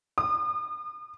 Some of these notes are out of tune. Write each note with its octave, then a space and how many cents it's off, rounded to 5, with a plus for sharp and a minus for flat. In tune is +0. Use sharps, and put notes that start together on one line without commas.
D#6 -40